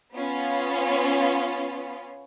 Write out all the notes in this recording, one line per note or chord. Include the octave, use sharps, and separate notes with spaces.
B3 C#4 F4